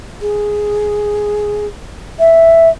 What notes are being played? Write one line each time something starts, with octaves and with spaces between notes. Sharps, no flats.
G#4
E5